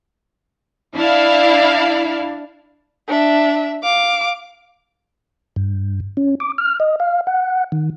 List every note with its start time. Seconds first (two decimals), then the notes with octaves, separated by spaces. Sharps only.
0.95 D4 E4 F5
3.08 D4 E5
3.83 F5 D6
5.56 G2
6.17 C#4
6.40 D6
6.58 F6
6.80 D#5
7.00 F5
7.27 F#5
7.72 D#3